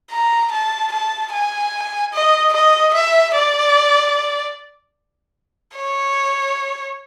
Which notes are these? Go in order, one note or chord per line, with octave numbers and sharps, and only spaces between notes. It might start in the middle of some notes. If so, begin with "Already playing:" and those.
A#5
A5
A5
G#5
D#5
D#5
E5
D5
C#5